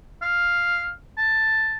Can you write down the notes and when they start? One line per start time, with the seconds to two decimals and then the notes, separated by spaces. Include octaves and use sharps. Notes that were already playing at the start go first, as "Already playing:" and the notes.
0.22 F5
1.18 A5